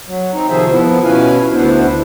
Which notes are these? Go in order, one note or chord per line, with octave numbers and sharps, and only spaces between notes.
F#3
C4 D#4
C3 D#3 F3 G#4 C5 E5
F3 B3 E4
B2 C#4 E4 B4 F5 G#5
D2 B3 D4 E4 C5